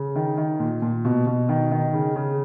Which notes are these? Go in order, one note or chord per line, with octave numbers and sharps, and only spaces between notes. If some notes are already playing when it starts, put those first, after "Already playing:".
Already playing: C#3
D#3
D#3
A#2
A#2
B2
B2
D#3
D#3
C#3
C#3